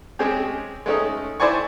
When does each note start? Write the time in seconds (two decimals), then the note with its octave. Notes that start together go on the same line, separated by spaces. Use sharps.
0.19 G#3 C4 C#4 G4 G#4
0.86 G#3 A3 C#4 D#4
1.40 E4 C5 D5 G#5 C#6